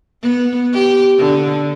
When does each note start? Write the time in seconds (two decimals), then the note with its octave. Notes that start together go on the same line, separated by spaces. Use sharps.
0.23 B3
0.73 G4
1.19 D3